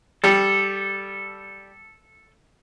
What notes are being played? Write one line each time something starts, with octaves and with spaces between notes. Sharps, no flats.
G3 A4